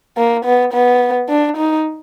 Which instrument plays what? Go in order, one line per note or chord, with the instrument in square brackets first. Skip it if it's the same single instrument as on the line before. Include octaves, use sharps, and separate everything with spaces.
[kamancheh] A#3
B3
B3
D4
D#4